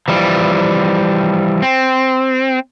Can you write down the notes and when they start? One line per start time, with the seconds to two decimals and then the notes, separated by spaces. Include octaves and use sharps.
0.08 E3 F3 G3
1.63 C4